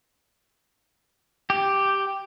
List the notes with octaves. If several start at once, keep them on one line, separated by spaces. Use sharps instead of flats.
G4